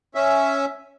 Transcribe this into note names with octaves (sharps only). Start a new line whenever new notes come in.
C#4 E5